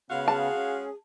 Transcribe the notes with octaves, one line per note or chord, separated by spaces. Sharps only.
C#3 G#3 B3 C#4 F#4 F5
G#4 A5
C#4